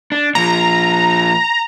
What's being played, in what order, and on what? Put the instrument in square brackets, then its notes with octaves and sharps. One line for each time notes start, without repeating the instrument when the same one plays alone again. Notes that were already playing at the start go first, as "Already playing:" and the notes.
[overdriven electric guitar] D4
[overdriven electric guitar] A#2 F3 [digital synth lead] A#5